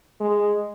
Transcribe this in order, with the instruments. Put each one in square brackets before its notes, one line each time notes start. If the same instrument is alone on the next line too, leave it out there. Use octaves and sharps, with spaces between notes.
[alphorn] G#3